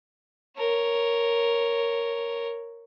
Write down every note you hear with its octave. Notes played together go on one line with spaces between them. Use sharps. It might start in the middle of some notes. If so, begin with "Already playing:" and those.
A#4 C#5